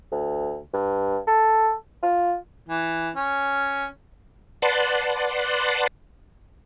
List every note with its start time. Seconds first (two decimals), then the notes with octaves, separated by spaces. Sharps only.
0.12 D2
0.74 G2
1.27 A4
2.03 F4
2.68 E3
3.16 C#4
4.62 B4 D5 F#5 A5 C6